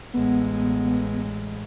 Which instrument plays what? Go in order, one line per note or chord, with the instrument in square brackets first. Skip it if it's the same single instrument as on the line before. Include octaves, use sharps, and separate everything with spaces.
[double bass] A1 G#3 [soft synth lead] B3